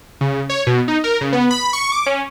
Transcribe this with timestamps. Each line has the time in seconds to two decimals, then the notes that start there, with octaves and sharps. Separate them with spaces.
0.21 C#3
0.49 C#5
0.67 B2
0.88 D#4
1.04 A#4
1.21 C#3
1.33 B3
1.51 B5
1.73 C#6
1.92 D6
2.06 C#4